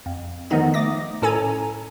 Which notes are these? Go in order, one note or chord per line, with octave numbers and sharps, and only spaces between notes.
F2
D#3 F3 A3 B3 D#4 D#5
A3 D6 D#6 A#6
A2 C#4 A4 G#5 A#5 G#6